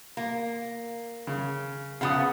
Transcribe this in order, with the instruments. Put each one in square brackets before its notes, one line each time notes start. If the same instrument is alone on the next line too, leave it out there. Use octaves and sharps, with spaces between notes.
[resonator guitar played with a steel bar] A#3
[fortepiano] C#3
[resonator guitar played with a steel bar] C#3 F3 B3 [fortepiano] F5 F#5 D#6